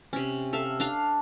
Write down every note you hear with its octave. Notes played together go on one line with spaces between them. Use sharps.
C3 C#4
A4 E5 F5
D4 F5